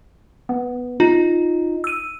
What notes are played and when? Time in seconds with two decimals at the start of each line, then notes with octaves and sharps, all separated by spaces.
0.49 B3
1.00 D#4 F4
1.84 E6 D#7